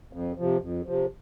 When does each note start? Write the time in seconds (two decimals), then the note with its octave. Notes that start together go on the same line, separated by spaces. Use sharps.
0.13 F2
0.38 C3 F3
0.62 F2
0.86 C3 F3